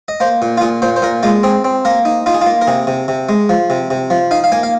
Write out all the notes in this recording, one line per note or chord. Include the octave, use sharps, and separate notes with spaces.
D#5
A#3 C5
A#2
F4
A#2 G#4
A#2 C5
C5
A#2 A#4
G#3 F4
C4 G#4
C4
A#3 A#4
D#4
D#4 F4
G#4
F4
A#3
A#4
C3 G#4
C3
C3
G#3
F3
C3
C3
F3
D#4 F5
F5
A#3 G#5
F5